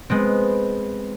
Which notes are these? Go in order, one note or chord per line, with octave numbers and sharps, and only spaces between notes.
G#3 B3 C4